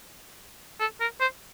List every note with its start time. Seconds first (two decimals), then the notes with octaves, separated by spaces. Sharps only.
0.80 A4
1.01 A#4
1.21 C5